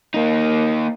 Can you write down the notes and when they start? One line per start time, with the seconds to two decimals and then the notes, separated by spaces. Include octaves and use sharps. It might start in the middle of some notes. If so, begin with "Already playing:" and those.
0.14 A#3 D#4